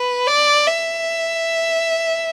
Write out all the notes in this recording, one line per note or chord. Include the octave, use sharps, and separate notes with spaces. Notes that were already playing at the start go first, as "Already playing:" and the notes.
Already playing: B4
D5
E5